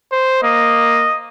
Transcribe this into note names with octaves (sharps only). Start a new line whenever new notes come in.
C5
A#3 D#5